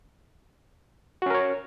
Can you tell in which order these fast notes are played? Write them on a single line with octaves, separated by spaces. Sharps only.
F#4 C#4 A#4 C#5